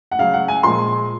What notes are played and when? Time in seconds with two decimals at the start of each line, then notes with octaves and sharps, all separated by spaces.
0.12 F#5
0.19 C#3 F#3 F5
0.34 F#5
0.48 G#5
0.63 A#2 F3 G#3 C6